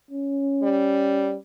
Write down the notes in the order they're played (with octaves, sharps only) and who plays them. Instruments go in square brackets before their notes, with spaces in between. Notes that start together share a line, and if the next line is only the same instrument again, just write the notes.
[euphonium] C#4
[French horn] G3